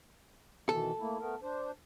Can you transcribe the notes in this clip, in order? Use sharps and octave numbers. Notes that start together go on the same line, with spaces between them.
B2 D#3 E3 A4
A3 A#3 E4
A3 B3 A#4
D4 C5